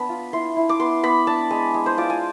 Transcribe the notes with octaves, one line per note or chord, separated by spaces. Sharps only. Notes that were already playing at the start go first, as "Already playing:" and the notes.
Already playing: B3 D4 B5
F4
E4 C6
E4
D6
B3 C6
B3 B5
D4 A5
G#3 G#5
G#3
C5
F4 D5
G#5